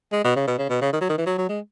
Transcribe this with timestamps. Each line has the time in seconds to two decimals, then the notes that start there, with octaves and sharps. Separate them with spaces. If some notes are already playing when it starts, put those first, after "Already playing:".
0.13 G#3
0.24 B2
0.36 C#3
0.47 B2
0.58 C#3
0.70 B2
0.81 C#3
0.93 D#3
1.01 F#3
1.09 D#3
1.18 E3
1.26 F#3
1.38 F#3
1.49 G#3